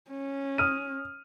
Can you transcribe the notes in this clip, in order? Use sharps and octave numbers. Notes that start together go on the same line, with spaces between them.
C#4
D#6 F6 D#7